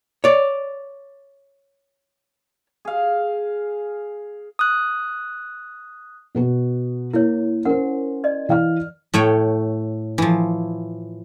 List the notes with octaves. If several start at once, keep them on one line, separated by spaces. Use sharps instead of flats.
C#5 D5
G#4 F5
D#6 F#6
B2 B3 F#4
A#3 E4 C#5
C#4 A#4 C5 F#5
D5 D#5
E3 F5 F6
A2 A3 C#5 G5
E3 F3